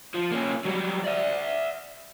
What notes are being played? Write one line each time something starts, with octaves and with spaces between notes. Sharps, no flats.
F3
A#3 C#4
F#3 G3
D5 E5